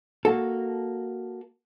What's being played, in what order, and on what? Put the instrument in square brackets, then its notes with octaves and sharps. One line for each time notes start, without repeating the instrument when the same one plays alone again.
[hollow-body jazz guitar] A#3 F#4 A4